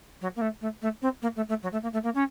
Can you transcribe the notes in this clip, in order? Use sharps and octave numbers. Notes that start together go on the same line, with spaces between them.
F#3
A#3
A3
A3
A3
C4
A#3
A3
A3
F#3
A3
A#3
A3
A#3
C#4